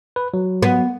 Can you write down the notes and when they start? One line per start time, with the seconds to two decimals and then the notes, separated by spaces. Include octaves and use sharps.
0.16 B4
0.34 F#3
0.62 B3